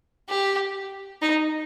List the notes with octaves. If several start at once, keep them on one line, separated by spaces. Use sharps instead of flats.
G4
D#4